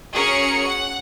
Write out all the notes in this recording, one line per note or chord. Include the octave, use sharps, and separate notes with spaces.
C#4 F#4 G#4 A#4 C#7
F#5